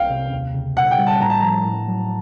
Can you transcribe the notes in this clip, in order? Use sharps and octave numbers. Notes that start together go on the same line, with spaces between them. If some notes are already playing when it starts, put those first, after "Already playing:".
Already playing: C2 F5 G5
C3
D#2
C#3
B2 F#5
G5
G3
A5
A2 A#5
A5
F3 A#5
A2
F#3